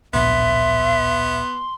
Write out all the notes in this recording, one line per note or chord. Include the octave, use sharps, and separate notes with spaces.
D1 A#1 B3 E5 C6